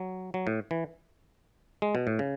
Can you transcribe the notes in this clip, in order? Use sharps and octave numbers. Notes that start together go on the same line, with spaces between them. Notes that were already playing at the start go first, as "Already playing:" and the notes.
Already playing: F#3
F#3
A2
E3
G#3
B2
A2
C#3